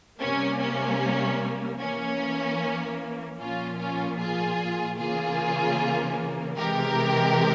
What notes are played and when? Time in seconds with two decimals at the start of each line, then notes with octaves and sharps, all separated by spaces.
0.20 C3 G3 A#3 C#4
0.60 C#4
1.80 E3 A#3 C#4
3.38 A#2 F3 A#3 C#4 F4
3.78 C#4 F4
4.19 F4 G#4
4.98 C#3 E3 A#3 F4 G#4
6.57 C3 E3 G#3 G4 A#4